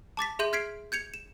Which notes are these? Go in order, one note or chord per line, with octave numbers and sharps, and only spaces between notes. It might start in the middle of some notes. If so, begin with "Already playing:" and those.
A5 D6 A6 B6
G#4 E5 C6 G6 D#7 F#7
F6 G#6 B6 C7 D7
G6 G#6 C#7 F7
E7